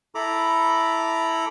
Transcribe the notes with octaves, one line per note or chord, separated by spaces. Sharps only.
E4 A4 A#5 B5 D6